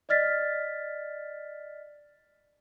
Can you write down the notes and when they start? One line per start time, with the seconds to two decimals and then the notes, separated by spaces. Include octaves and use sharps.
0.09 D5 D#5 F6 A6 B6